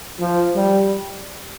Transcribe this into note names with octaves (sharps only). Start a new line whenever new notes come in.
F3
G3